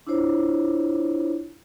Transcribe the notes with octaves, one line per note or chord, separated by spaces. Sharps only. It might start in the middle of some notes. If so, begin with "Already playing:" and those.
D4 E4 F4 C5 C#5